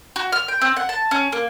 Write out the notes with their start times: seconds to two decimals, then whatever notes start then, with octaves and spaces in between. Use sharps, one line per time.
0.16 F#4
0.32 F6
0.48 G5
0.61 C4
0.76 F#5
0.89 A5
1.11 C#4
1.32 A#3